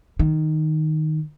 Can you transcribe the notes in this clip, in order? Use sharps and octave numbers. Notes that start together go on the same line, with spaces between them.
D#3